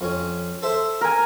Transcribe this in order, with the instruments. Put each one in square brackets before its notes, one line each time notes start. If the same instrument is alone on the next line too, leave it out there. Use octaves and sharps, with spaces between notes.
[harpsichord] F2 C#4
A4 C5 E5
[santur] A#4 G#5